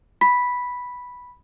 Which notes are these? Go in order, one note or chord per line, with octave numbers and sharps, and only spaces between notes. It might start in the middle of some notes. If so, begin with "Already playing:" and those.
B5 B6